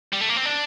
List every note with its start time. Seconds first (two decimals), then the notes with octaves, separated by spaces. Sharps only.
0.13 G3
0.21 A3
0.29 A#3
0.37 C4
0.46 D4